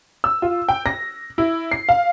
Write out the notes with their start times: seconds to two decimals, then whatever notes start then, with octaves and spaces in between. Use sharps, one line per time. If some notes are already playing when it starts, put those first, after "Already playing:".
0.24 E6
0.42 F4
0.69 G5
0.86 A#6
1.38 E4
1.71 C7
1.89 F5